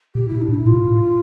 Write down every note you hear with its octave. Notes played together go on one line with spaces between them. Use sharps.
A#2 G4
A#2 E4
D4
A2
E4
A#2
F4
A2